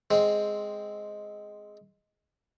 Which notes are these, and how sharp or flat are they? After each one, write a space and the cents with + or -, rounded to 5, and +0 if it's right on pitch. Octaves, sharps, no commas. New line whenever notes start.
G#3 +0 C4 +0